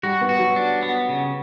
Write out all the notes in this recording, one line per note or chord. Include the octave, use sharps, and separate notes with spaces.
G3 F#4
B3
F#4
F#3
D4
B3
C#3